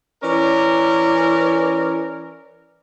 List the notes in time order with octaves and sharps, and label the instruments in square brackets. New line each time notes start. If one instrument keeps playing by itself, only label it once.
[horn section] E3 C#4 A#4 D5